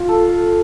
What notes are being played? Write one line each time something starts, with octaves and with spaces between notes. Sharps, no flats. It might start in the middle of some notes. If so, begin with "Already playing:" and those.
Already playing: F4
A4